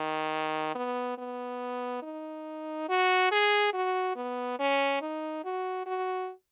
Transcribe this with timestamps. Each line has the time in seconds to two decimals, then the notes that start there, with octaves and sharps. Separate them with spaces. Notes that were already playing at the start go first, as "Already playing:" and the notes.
Already playing: D#3
0.75 B3
1.18 B3
2.03 D#4
2.89 F#4
3.31 G#4
3.74 F#4
4.16 B3
4.59 C#4
5.02 D#4
5.45 F#4
5.86 F#4